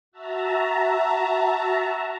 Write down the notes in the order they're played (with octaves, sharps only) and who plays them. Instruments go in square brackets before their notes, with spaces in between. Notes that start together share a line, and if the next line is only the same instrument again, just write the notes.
[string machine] F#4 E5 A5 A#5